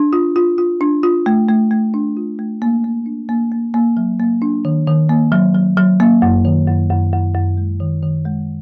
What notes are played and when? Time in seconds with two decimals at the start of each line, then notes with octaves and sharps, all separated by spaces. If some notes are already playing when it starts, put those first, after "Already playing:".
Already playing: D4
0.13 F4
0.36 F4
0.58 F4
0.81 D4
1.03 F4
1.26 A3
1.49 A3
1.71 A3
1.94 D4
2.17 F4
2.39 A3
2.62 A#3
2.84 A#3
3.06 D4
3.29 A#3
3.52 A#3
3.74 A#3
3.97 F#3
4.20 A#3
4.42 D4
4.65 D#3
4.87 D#3
5.09 A#3
5.32 F#3
5.55 F#3
5.77 F#3
6.00 A#3
6.22 F#2
6.45 D#3
6.68 F#2
6.90 F#2
7.13 F#2
7.35 F#2
7.57 G#3
7.80 D#3
8.03 D#3
8.25 G#3